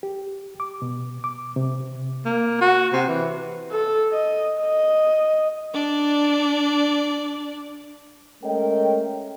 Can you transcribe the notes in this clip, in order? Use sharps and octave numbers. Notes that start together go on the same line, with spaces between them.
G4
D6
B2
D6
C3
A#3
F#4
C3
E3
A4
D#5
D#5
D4 D5
G#3 A3 C#4 A#4 D#5 G5